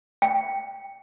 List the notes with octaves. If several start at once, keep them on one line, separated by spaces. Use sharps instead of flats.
G5